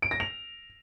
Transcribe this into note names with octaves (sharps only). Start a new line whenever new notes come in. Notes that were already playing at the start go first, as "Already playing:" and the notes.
D7
A#6
F7